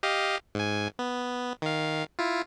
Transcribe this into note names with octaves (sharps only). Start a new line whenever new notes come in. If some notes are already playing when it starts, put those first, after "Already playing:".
G4 D#5 F5
G#2 G#5
B3
D#3 F5
E4 F4